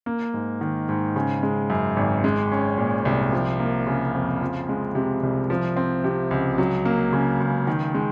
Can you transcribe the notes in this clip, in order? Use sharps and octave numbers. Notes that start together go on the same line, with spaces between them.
A#3
G#2
D#3
G#2
C#3
G#3
F#2
G#1
G#3
C#4
A#2
C2
F3
A#3
C#3
F2
F3
G#3
C3
C2
F3
C4
C3
C#2
F#3
A#3
C#3
C#2
D#3
G#3